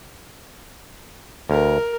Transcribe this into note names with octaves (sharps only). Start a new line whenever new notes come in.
D2 A#4